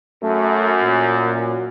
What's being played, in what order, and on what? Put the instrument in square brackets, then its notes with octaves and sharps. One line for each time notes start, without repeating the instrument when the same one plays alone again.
[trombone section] F#2 [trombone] A3
[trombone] A#2